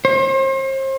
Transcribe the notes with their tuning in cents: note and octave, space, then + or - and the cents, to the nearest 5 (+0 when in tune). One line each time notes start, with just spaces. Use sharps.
C5 +40